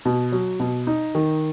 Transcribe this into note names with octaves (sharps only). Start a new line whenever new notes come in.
B2
F#3
B2
D#4
D#3